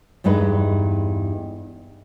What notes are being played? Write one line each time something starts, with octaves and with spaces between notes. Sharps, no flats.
E2 G2 G#3 D#4 B4